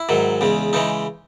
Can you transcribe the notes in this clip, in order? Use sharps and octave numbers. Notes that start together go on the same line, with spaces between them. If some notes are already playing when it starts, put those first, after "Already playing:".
Already playing: E4
G#2 D#3 F#3
E2 C#3 G#3
C#3 E3 G#3 D#4